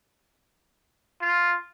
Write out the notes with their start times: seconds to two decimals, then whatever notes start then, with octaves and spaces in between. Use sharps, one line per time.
1.21 F4